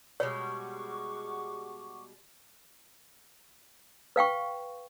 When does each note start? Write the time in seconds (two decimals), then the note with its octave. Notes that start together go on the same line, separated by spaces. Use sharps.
0.20 B2 G3 G#3 C#5 F#5 C#6 D6
4.16 B4 F5 G5 C#6